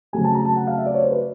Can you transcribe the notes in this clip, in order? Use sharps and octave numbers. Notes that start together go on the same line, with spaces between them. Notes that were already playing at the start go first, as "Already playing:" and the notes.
C#3 F#3 A3 C4 G#5
A5
A#5
A5
F#5
F5
E5
D5
C#5
C5
B4